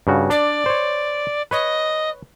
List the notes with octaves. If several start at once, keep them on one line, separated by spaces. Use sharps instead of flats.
G2 C#3 F#4
D4 D5
C5 C#5
B4 C#5 D#5